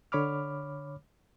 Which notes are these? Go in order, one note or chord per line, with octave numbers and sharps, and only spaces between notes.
D3 C#5 B5 D6 F6